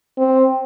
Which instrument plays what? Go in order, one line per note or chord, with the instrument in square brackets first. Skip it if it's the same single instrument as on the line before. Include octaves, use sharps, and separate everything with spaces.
[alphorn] C4